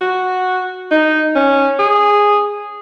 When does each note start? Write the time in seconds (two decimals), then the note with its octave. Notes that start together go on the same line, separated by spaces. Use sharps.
0.01 F#4
0.91 D#4
1.36 C#4
1.79 G#4